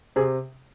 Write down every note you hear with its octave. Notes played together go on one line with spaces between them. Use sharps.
C3 G#4